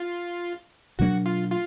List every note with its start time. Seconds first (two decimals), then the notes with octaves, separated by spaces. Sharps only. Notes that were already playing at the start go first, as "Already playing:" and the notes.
Already playing: F4
0.99 B2 F#3 A#3 D4 F#4
1.26 F4
1.51 F4